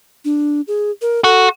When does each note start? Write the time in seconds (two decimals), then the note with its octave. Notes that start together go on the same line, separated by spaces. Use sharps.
0.25 D4
0.68 G#4
1.02 A#4
1.24 F#4 A4